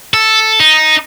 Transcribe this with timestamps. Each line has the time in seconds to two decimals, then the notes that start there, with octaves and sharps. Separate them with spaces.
0.14 A4
0.60 D#4